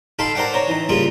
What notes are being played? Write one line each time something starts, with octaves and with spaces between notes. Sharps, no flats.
D#4 A4 F5 G5 B5 C6
A#4 C5 D5 F#5 G5
C5 C#5 A#5
E3 D#4
C#3 G3 A#3 C#4 F4 G#4